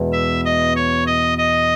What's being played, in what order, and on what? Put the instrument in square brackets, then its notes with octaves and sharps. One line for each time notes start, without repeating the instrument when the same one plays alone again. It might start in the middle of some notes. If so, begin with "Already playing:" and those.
Already playing: [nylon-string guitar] E2 B2 G#3
[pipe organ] E5
D#5
C#5
D#5
D#5